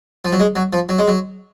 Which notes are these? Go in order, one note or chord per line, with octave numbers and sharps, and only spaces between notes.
F3
F#3
G#3
F#3
F3
F#3
G#3
F#3